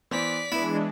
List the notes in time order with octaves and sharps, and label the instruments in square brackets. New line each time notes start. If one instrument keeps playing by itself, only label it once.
[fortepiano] E3 B3 C5 [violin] D5 B6
[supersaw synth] E3 G#3 D4 [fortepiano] B3 B4 [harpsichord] E4